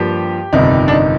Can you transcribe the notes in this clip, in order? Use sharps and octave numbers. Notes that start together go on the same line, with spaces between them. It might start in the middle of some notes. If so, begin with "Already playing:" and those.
Already playing: G2 F3 A#3 G4
G1 F2 C3 D#3 G3 D#4
D4
D#4